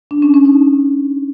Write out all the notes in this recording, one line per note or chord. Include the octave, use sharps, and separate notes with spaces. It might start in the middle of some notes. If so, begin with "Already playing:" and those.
D4
C#4
C#4
D#4